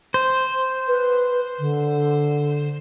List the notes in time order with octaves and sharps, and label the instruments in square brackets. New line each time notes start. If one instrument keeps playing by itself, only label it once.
[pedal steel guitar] C5
[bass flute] B4
D3